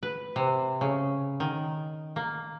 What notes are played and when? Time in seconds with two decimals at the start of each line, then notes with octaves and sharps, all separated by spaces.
0.03 B4
0.36 C3
0.81 C#3
1.40 D#3
2.16 A#3